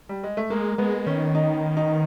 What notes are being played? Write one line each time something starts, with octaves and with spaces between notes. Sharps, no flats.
G3
G#3
A3
G#3 A#3
G#3 B3
D#3 C#4
D#4
D#4